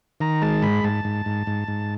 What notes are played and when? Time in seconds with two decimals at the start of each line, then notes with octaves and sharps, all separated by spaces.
0.20 D#3 A#5
0.42 G#3 A5
0.62 G#2 B5
0.84 G#2 A5
1.05 G#2
1.26 G#2
1.47 G#2
1.68 G#2